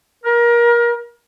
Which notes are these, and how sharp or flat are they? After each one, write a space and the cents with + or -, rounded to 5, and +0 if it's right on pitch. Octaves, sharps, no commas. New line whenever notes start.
A#4 +25